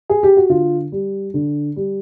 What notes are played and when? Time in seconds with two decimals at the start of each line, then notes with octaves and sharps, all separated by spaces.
0.10 G#4
0.23 G4
0.37 F#4
0.49 D3 F4
0.92 G3
1.34 D3
1.76 G3